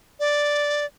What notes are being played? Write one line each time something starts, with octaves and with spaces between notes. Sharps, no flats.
D5